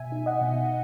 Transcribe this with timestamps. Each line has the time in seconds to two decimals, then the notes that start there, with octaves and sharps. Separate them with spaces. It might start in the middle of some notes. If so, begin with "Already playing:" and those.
Already playing: B2 E5 G#5
0.12 D#4
0.26 D#5 F#5
0.41 B2